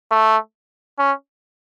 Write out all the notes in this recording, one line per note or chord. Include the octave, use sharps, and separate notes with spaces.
A3
C#4